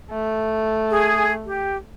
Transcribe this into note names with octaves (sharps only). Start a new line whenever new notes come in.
A3
G#4
G4